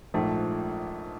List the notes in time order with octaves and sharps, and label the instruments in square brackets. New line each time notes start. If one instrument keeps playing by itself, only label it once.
[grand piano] A#1 G#2 F3 A3